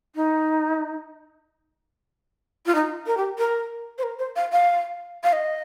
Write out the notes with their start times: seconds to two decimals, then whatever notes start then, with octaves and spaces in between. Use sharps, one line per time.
0.16 D#4
2.66 F4
2.75 D#4
3.07 A#4
3.17 G4
3.38 A#4
3.98 C5
4.03 A#4
4.19 C5
4.36 F5
4.52 F5
5.24 F5
5.33 D#5